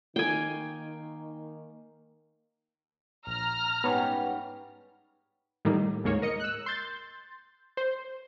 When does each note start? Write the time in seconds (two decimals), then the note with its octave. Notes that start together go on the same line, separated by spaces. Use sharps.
0.16 D#3 A#3 G5 G#5
3.27 A#1 A#5 F6
3.84 G#2 G3 B3 C#4 C#5
5.65 A2 D#3 G3 A#3
6.04 D2 G#2 A#3 C#5
6.22 A#4 D#5 C#7
6.40 E6 F#6
6.66 C6 G6 A6
7.77 C5